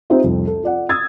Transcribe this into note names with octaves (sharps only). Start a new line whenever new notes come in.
C4 D#4 F4 G4 C5 E5
C2 F2
A4
F4 D5 F#5
D#6 E6 G#6 A6